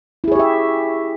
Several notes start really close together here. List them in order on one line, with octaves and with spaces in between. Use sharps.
E4 G#4 C#5 G4 E5